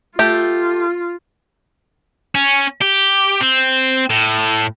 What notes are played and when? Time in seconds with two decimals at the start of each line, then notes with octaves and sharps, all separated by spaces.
0.19 A3 F4 G4
2.35 C#4
2.82 G4
3.41 C4
4.10 A2